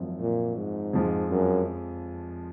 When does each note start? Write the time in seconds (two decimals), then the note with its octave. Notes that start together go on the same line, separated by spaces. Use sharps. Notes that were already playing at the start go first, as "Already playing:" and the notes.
Already playing: G#1 F#2 F3
0.19 A#2
0.56 G#2
0.93 F2 F3 G#3
1.30 F#2